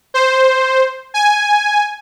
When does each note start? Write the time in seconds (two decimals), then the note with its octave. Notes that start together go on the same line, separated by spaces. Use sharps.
0.14 C5
1.14 G#5